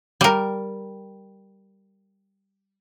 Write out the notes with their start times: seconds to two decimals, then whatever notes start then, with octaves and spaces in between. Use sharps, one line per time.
0.21 G3 A#4